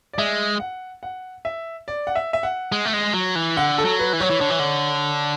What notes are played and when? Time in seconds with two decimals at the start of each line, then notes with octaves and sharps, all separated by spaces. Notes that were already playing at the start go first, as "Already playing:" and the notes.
0.13 D5
0.18 G#3 E5
0.60 F#5
1.03 F#5
1.45 E5
1.88 D5
2.07 F#5
2.15 E5
2.33 E5
2.43 F#5
2.72 G#3
2.85 A3
2.93 G#3
3.14 F#3
3.35 E3
3.57 D3 F#5
3.78 A4
3.85 F#3
3.99 B4
4.13 E3
4.20 F#3 C#5
4.30 E3
4.41 D3
4.50 E3
4.59 D3